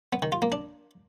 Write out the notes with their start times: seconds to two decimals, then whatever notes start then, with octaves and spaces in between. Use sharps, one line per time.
0.13 B3
0.22 D#3
0.32 F4
0.42 A#3
0.52 D4